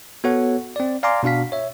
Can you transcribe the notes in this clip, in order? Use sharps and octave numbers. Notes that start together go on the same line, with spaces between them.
B3 F#4 A4 C#5 F#5
C4 D5
D5 F5 G#5 A#5 C6 D6
B2 D4 F#4 F5 B6
C#5 E5